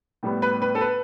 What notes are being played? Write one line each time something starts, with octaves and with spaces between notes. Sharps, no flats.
A2 G3 B3
B4
B4
A4
B4